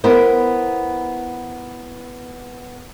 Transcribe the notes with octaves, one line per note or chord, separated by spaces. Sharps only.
B3 E4 A#4 C5